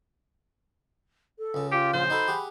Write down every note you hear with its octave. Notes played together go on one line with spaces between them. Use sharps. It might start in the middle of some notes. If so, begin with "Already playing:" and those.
A4
C#2 C#3
F4 G4
A#1 C#3 C5
D#4 F#4 A4 B5
G4 G#4 F#5